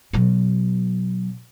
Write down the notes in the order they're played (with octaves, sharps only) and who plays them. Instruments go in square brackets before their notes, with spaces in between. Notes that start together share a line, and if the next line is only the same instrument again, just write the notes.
[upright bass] B2 F#3